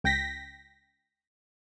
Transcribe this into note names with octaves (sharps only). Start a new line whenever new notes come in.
C#2 G5 A#6 B6